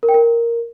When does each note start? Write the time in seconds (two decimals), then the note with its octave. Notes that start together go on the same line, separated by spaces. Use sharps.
0.03 A#4
0.09 G5
0.14 A#4